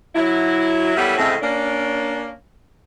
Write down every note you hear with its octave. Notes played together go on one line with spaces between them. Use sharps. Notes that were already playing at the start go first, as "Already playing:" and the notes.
F#3 E4
G3 B3 E4 A4 A#4 C#5
A2 C#3 G#3 A3 C4
A#3 C#4 D4